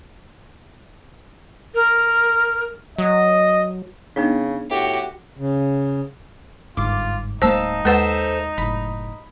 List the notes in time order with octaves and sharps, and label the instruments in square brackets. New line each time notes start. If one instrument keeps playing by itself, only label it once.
[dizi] A#4
[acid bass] F#3 [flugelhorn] D#5
[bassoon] C#3 [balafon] B3 D4 D#4
[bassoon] A2 [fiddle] F#4 G4
[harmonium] C#3
[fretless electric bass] G1 G#2 [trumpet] F4 [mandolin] D6
[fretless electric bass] D1 G#3 A#3 [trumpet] D#4 [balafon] C5 [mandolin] F5 A5 E6
[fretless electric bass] D#2 [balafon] G#3 B4 F#5 [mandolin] A4 C5 E5
[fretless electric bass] F#1 A2 [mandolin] B5